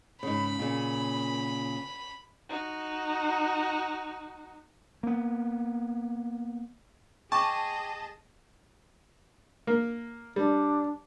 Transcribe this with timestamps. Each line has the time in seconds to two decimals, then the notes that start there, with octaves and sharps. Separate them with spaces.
0.23 G#2 C#3 B5
0.59 A#2 C#3
2.49 D#4 F#4
5.03 A#3 B3
7.32 G#4 D#5 G5 A5 C#6 D6
9.67 A#3 A#4
10.36 G3 D4